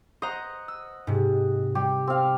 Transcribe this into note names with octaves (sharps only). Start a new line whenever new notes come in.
C5 D#5 F#5 A#5
E6
G#2 C3
G3 G4
C4 F5